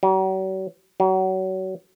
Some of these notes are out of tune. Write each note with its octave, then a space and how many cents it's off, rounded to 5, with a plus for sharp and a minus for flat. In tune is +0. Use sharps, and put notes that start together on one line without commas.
F#3 +45
F#3 +30